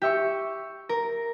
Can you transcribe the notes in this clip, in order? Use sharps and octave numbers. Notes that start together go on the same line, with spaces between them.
G4 E5 C#6
A#4